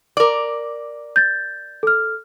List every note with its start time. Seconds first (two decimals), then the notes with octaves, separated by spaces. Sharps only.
0.17 A#4 D5 D6
1.16 G6 A6
1.83 A4 F6